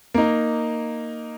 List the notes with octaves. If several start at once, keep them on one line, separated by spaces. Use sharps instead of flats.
A#3 D#4